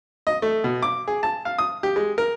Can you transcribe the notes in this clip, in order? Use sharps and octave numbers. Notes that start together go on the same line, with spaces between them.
D#5
A3
B2
D6
G#4
A5
F5
D#6
G4
G#3
A#4